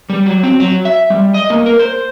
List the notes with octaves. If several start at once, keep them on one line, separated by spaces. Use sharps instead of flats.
G3
F#3
C4
F#3
E5
G3
D#5
A#3
A#4
C5